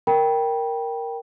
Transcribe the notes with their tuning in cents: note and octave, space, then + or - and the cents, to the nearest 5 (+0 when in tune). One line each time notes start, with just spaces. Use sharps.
A#4 +0 G5 +0 B5 -30